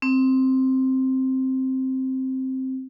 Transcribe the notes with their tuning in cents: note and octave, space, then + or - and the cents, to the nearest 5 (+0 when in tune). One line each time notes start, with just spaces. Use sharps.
C4 +5